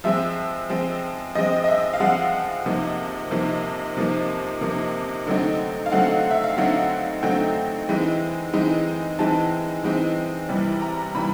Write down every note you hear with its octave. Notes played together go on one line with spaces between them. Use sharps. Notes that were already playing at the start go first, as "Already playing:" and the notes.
F3 G#3 C4 E5
F3 G#3 C4
F3 G#3 C4 D#5
D#5
E5
F5
F3 G#3 C4 F#5
C3 F3 A#3 D#4
C3 F3 A#3 D#4
C3 F3 A#3 D#4
C3 F3 A#3 D#4
D3 F#3 A3 C4 D#4
F5
D3 F#3 A3 C4 D#4 F#5
E5
F5
D3 F#3 A3 C4 D#4 F#5
D3 F#3 A3 C4 D#4 G5
E3 G#3 C4 D#4
E3 G#3 C4 D#4
E3 G#3 C4 D#4 A5
E3 G#3 C4 D#4
C3 E3 G3
A#5
C3 E3 G3 B5